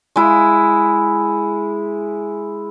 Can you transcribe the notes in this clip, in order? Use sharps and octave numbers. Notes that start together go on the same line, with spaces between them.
G#3 E4